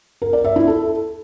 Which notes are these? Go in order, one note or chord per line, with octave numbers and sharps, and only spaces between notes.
A#4
D5
E5
E4
A4